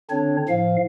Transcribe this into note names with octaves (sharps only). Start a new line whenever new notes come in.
D3 C4 D4 C#5
A2 F3 F5